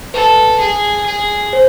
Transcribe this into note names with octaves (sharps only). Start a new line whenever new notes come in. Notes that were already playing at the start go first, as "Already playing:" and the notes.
A4 B4
G#4
G#4
C5